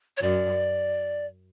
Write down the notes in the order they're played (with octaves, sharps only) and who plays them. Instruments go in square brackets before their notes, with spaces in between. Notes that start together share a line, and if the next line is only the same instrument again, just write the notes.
[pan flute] C#5
[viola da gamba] F#2 [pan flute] D5